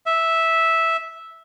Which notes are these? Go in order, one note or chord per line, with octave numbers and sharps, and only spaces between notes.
E5